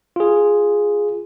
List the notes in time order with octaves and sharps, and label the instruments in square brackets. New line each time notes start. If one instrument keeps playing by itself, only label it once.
[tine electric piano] F4 G#4